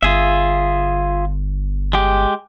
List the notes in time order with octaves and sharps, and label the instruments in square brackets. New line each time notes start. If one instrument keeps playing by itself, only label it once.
[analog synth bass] G1 [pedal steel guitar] F4 G#4 E5
[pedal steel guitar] G#3 G4